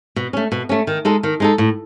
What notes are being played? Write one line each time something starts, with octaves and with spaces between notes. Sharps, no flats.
B2
A3 C#4
B2
A3 C#4
D#3
G#3 D#4 A4
D#3
G#3 D#4 A4
A2